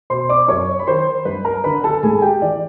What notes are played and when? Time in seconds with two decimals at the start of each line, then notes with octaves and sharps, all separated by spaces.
0.10 B2 C5 C6
0.29 D5 D6
0.48 F#2 C#5 C#6
0.79 B5
0.87 D#3 C5 C6
1.25 G2 B4 B5
1.45 A#4 A#5
1.64 D3 B4 B5
1.84 A4 A5
2.03 G#2 G#4 G#5
2.22 G4 G5
2.42 E3 D5